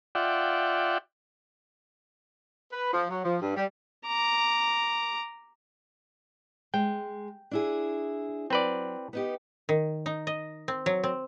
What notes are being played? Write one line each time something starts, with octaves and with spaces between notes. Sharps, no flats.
F4 D5 E5 F#5 G5
B4
F3
F#3
F3
G2
G3
A#5 D6
G#3 G5
D4 E4 G#4
F#3 C4 B4 D5
B3 D#4 G4
D#3
D#4
D#5
C4
F#3
C4